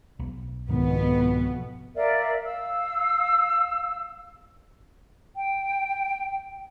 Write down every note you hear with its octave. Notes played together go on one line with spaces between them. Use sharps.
B1
C2 F2 G#2 B2 D#3 B3
A#4 D5 E5 F5
F5 E6
G5